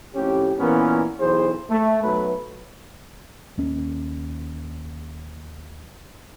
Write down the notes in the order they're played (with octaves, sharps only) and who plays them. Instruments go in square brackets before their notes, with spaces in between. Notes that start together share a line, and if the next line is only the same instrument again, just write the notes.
[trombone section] F2 A2 C#4 G4
A#2 E3 B3 C#4 F4 A#4
B1 E3 G#4 C5
A3
B1 F#3 A3 B4
[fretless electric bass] D#2 C#4